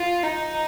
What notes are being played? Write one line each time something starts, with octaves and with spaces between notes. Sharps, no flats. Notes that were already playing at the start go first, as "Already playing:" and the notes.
Already playing: F4
D#4